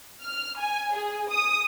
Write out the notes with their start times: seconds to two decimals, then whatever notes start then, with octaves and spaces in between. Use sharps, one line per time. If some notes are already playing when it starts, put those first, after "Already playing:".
0.24 F6
0.60 G#5
0.95 G#4
1.31 D#6